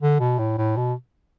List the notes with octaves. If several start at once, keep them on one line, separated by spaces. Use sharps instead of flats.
D3
B2
A2
A2
B2